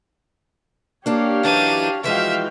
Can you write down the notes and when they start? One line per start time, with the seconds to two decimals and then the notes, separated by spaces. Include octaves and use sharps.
1.06 A#3 D4 G4 C#5 F5
1.43 F#2 E3 D4 D#4 D#7
2.04 E3 F3 G#3 F#4 E5 F5 G5